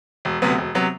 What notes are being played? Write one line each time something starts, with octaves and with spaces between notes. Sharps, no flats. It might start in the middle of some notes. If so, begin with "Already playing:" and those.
E1
D2 C3 F#3 B3
E1
C3 F#3 B3